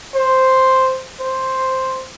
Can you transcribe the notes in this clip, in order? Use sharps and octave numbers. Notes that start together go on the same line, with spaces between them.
C5
C5